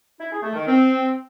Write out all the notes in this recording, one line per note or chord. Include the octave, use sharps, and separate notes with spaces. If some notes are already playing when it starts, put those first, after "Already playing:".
E4
G#4
A3
D#3
C4